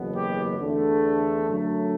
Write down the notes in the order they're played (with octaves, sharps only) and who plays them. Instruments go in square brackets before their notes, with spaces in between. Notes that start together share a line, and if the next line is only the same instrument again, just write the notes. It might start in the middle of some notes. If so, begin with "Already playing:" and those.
Already playing: [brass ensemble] F#1 E2 B2 F#3 B3
G4
E2 D3 A3
F#2 D3 F#3 A3